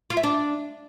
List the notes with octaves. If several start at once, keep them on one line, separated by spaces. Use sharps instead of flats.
F4
E5
D4